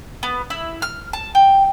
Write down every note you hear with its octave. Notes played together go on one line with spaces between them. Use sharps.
B3
E4
F6
A5
G5